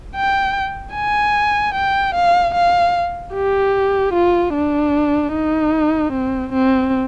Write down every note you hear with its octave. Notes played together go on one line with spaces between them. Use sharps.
G5
G#5
G5
F5
F5
G4
F4
D4
D#4
C4
C4